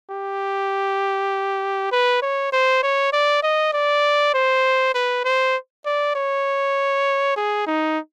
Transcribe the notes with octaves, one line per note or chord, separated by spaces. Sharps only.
G4
B4
C#5
C5
C#5
D5
D#5
D5
C5
B4
C5
D5
C#5
G#4
D#4